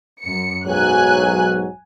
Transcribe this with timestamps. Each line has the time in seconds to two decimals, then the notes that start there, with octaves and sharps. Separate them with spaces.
0.23 F#2 C#7
0.67 B1 G#2 F#3 G#5 F#6